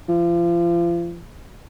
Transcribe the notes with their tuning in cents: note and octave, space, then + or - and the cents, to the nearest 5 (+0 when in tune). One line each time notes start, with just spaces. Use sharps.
F3 -35